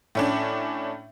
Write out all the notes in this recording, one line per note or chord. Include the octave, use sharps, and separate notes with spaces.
A2 C#4 D4